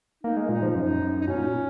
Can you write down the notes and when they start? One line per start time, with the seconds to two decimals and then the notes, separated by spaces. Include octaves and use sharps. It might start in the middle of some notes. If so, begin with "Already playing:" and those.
0.23 A#3 D#4
0.37 G#3
0.49 A#2 D#4
0.62 F3
0.75 F#2 D#4
1.02 F#2
1.21 D#4
1.27 B2 C#4
1.37 A#2